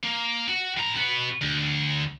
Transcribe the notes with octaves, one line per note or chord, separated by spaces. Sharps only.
A#3
F#4
A2 A#5
B3 F#4
D2